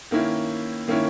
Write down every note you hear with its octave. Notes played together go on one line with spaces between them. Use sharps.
D#3 A#3 C#4 E4
D#3 A#3 C#4 E4